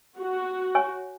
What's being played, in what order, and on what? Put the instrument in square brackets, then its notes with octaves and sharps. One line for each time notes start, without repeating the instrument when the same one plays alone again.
[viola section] F#4
[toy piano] C#5 G#5 C#6